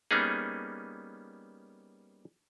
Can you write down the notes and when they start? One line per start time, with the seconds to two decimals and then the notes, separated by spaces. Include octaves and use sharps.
0.11 G3 A#3 B3 C#4 D#4 G#4